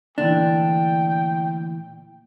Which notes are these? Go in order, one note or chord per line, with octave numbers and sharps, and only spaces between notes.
D2 A#2 E3 D4 G5